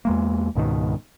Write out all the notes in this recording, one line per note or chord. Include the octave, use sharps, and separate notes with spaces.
E2 G#3 A#3
C#2 G#2 B2 D#3